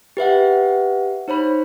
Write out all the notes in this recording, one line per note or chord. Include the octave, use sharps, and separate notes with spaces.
G4 B4 E5 F#5
D#4 C5 C#5 B5